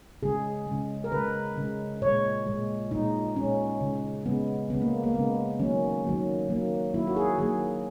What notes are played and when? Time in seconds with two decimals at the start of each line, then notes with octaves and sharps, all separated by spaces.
0.23 C#3 G#3 G#4
0.67 C#3 G#3
1.04 A#4
1.12 C#3 G#3 B4
1.57 C#3 G#3
2.02 A#2 G#3 C#5
2.46 A#2 G#3
2.91 A#2 G#3 D#4
3.35 A#2 G#3 C#4
3.81 C#3 G#3
4.26 C#3 G#3 B3
4.70 C#3 G#3 B3
4.82 A#3
5.04 A#3
5.15 C#3 G#3 B3
5.59 D#3 F#3 A#3 C#4
6.04 D#3 F#3 A#3
6.49 D#3 F#3 A#3
6.94 D#3 F#3 A#3 E4
7.07 F#4
7.16 G#4
7.38 D#3 F#3 A#3 G#4